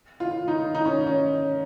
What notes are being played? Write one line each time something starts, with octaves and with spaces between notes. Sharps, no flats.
F4
D#4
D#4
C#4
C#4